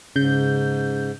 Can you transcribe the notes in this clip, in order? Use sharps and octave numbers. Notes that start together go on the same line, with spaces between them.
G#2 C#3 G6